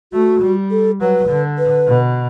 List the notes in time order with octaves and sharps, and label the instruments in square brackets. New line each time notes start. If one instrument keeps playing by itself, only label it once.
[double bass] A3 [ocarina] F#4
[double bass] G3
[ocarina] A4
[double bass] F#3 [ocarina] B4
[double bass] D3
[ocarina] B4
[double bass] B2